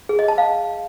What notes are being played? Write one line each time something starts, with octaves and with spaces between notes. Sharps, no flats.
G#4
D#5
A5
F5